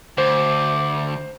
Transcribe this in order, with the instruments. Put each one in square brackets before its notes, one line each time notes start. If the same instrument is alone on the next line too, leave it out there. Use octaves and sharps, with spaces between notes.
[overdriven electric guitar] D2 [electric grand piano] C5 [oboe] D6